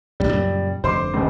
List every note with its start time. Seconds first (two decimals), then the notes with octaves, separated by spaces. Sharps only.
0.20 A1 F#2 G3
0.33 F#2 A#2 C#3
0.84 F1 G2 D3 C5 C6 D6
1.14 D#1 C#2